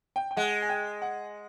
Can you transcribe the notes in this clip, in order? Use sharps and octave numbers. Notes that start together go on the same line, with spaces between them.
G5
G5
G#3 F#5
G#5
G5
F#5